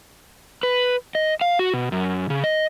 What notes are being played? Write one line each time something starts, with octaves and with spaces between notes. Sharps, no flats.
B4
D#5
F5
F#4
B2
F#2
C#3
D#5